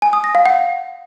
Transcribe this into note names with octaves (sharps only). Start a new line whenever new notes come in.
G#5
D#6
A#6
F5
F#5